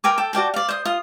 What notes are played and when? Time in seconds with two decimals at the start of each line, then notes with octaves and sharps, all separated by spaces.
0.04 A#4 G5 G#5 D6
0.18 A4 G5
0.33 F#4 D5 G5 A5
0.54 D5 F5
0.69 C5 D#6
0.85 F4 D#6